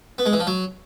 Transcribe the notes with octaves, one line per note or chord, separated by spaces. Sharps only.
B3
G#3
E3
F3
F#3